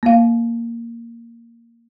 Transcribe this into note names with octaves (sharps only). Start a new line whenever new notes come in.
A#3 F5